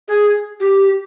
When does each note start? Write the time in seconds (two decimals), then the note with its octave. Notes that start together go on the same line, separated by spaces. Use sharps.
0.08 G#4
0.60 G4